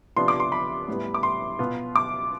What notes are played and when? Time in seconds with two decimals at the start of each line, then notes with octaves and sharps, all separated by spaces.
0.16 C3 F3 B3 D4 F4 C6
0.28 D6
0.40 C6
0.52 B5
0.88 A2 G3 B3
1.14 D6
1.23 C6
1.59 B2 B3 F4
1.96 D6